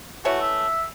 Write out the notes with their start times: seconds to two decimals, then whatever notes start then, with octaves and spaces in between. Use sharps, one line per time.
0.25 E3 A3 F#4 C#5
0.41 E5